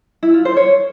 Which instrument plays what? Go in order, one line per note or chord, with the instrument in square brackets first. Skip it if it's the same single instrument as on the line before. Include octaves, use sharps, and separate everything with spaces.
[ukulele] E4
F4
C5
C#5